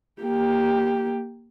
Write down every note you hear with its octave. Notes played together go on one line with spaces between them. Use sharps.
A#3 G4